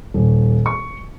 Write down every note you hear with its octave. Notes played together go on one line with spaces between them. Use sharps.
D#1
C#6